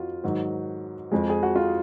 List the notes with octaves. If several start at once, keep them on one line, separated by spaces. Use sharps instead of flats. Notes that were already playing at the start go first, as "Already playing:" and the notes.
Already playing: F2 F4 F#4
G#2 D#3 F#3
F2 F3 G#3
G#4
F#4
F4